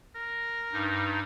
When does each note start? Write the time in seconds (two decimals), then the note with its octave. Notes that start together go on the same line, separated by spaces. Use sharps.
0.15 A#4
0.72 G2 D#4